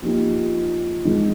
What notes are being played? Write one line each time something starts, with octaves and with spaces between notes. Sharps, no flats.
F3 A#3 D#4 G4
D#3 G#3 D#4